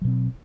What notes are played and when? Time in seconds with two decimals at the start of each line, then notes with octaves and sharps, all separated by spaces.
0.02 F#3
0.04 B2
0.07 C4